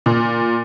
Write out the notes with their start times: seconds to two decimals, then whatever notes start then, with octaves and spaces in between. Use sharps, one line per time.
0.06 A#2